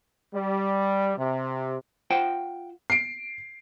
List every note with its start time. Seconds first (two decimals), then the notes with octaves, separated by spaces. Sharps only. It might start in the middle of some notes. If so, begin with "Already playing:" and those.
0.34 G3
1.17 C3
2.10 F4 C5 F#5 G5
2.90 C7 D7